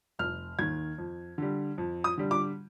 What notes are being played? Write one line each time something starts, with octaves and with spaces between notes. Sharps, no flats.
F1 F6
D#2 D#3 G#6
F2
D3 G3
F2
D#6
D3 G3
D6